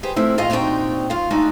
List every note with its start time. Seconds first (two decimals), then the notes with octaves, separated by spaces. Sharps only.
0.03 G4 G#4 B4 C5
0.16 F3 A3 C4 E4
0.38 A2 F4 G#4 D#5 F5
0.50 A#2 C4 D4 D#4 F#4 G5
1.10 F4 F5
1.31 G#3 A3 D4 D#4 F#4